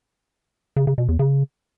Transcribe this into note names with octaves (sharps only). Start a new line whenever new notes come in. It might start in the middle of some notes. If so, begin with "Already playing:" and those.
C#3
C#3
B2
E2
C#3